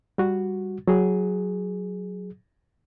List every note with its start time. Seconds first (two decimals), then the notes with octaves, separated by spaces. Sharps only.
0.18 G3 F#4
0.88 F#3 G#4